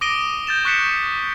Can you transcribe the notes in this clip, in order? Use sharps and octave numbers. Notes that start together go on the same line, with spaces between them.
D6 D#6 A#6 D7 D#7 G7
G6 A6 E7
C#6 F#6 B6 C#7 E7